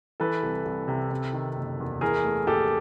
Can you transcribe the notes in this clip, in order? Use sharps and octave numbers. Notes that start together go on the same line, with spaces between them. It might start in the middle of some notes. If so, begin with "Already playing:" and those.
E3 A4 B4
C2
C2
C3
C3
D#3
F#1
E2
E3 G#4 A#4
A3
A#1 G4 A4